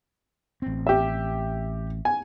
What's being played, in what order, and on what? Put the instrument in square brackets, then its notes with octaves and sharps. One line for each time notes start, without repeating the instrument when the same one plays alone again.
[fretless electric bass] A1 C4
[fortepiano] G4 E5
G#5